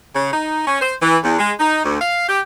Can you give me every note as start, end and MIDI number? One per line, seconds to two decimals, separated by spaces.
0.14 0.30 49
0.32 0.61 63
0.67 0.78 61
0.81 0.94 72
1.01 1.16 52
1.23 1.36 40
1.38 1.51 56
1.59 1.82 63
1.84 2.01 38
2.01 2.26 77
2.27 2.39 67